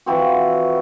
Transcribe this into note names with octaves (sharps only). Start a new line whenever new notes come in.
E3 F3 C4 F#4